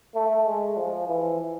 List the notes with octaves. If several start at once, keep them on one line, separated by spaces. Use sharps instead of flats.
A3
G#3
F3
E3